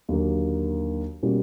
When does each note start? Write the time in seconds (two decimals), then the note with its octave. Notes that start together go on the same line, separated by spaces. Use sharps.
0.09 D#2 D3 F#3 A#3
1.23 B2 G3 A#3 C#4